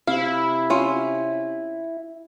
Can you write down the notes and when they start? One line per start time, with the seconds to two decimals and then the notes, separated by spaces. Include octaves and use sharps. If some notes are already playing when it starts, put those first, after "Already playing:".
0.07 C3 E4 F5
0.70 C#4 F4